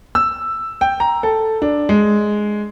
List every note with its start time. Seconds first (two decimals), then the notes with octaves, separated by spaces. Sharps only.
0.15 E6
0.81 G5
1.00 A#5
1.23 A4
1.62 D4
1.89 G#3